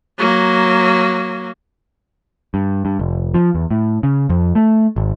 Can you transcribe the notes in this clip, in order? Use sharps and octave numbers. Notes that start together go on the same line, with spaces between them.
F#3 A#3
G2
G2
F1
F3
E2
A2
C#3
F2
A3
G#1